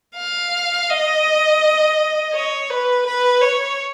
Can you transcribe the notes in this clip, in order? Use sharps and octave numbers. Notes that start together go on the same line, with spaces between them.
F5
D#5
C#5
B4
B4
C#5